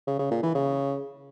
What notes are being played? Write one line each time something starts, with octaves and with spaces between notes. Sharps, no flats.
C#3
C#3
A#2
E3
C#3